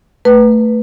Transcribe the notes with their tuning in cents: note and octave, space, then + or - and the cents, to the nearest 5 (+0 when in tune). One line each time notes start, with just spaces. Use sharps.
A3 +15 B4 -5